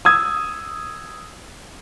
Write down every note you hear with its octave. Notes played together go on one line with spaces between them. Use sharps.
D#6 E6 G#6